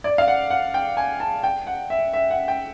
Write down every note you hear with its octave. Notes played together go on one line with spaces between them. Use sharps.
D5
F5
F#5
F#5
G5
G#5
A5
G5
F#5
E5
E5
F#5
G5